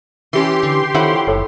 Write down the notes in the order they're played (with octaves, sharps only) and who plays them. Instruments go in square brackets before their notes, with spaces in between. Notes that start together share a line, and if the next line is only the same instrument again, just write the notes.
[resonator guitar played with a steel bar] E3 C#4 [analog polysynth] G4 C6
[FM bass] D3
[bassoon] F2 [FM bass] D#3 [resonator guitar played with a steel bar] E4 C#5 F#5
[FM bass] F#1 [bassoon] A2